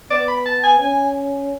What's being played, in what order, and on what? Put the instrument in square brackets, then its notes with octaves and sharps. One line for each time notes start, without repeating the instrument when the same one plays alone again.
[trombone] B3 [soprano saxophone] D5
[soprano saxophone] B5
A5
G#5
[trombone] C#4 [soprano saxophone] G#5